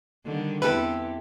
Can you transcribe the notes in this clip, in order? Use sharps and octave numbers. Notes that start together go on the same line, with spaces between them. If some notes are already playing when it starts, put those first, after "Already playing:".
D3 D#3 G3
E2 B3 C4 E4 G4 A4 B4